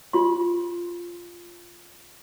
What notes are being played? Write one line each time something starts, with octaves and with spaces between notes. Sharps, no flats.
F4 C6